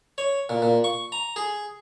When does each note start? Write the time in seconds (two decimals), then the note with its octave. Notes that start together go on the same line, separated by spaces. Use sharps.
0.18 C#5
0.49 A#2
0.62 A#2
0.84 C#6
1.12 A#5
1.36 G#4